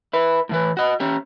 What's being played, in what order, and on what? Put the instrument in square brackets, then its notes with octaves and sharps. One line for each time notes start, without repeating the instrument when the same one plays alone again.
[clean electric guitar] E4 B4
A2 E3 B4
F#4 D#5
C#4 G4